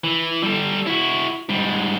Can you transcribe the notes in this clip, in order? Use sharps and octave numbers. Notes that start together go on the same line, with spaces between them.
E3
G3 A4
E4 F#4
G#2 G3